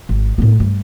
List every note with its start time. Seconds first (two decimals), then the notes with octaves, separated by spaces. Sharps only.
0.09 G#1
0.38 A2 B3
0.60 G2